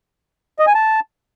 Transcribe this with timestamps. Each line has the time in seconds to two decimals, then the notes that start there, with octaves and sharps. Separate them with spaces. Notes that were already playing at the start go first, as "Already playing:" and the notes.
0.59 D#5
0.67 G#5
0.75 A5